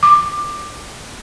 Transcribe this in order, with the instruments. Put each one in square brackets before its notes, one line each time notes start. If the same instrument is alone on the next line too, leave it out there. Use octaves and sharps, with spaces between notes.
[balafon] D6